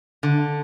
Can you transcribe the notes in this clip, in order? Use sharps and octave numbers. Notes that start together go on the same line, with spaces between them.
D3